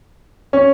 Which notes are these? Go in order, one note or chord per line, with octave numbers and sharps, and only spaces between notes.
C#4